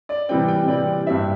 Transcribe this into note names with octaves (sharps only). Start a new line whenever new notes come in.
D5
C3 E3 G3 C4 G5
G5
C3 E3 G3 C4 D5
G2 G3 C4 E5